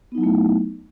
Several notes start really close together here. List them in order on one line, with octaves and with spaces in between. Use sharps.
B3 D#4 F#3 E4 A3